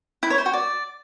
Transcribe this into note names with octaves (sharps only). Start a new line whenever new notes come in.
E4
C#5
C5
F#4
D5